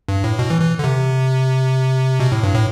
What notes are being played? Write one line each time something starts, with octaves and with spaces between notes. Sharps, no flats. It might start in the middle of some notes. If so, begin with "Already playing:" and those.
G2
A2
B2
E3
E3
D3
C3
B2
A2
G2
A2